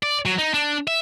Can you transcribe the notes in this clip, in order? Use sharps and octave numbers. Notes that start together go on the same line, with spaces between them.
D5
F#3
D#4
D4
E5